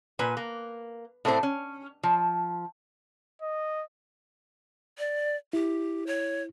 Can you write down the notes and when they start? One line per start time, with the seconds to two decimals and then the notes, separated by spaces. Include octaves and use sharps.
0.19 A#2 B4 G#5
0.37 A#3
1.25 A2 A3 C4 D4 C5
1.43 C#4
2.03 F3
3.42 D#5
4.98 D5
5.53 E4 G4
6.07 C#5